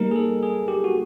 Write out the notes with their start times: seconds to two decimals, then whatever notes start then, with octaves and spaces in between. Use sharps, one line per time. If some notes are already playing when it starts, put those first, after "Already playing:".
Already playing: G3 A#3 D#4 A#4
0.11 G#4
0.16 A4
0.43 G#4
0.68 G4
0.84 F#4